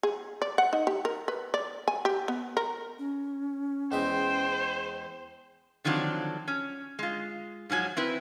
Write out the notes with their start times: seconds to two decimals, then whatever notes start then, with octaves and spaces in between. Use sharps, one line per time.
0.03 G#4
0.42 D5
0.58 F#5
0.73 D#4
0.87 G4
1.05 A#4
1.28 B4
1.54 D5
1.88 G#5
2.05 G4
2.28 B3
2.57 A#4
2.99 C#4
3.92 E2 G#3 C5 E5 G5
5.85 D3 D#3 F3 F#3 C4 D4
6.48 C#4
6.99 G#3 F4
7.70 G#2 F3 F#3 G#5
7.97 C4 E4 B4